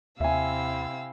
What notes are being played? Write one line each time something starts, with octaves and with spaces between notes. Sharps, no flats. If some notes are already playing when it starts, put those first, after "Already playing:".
D#2 C3 C4 E4 E5 F5 G#5 E6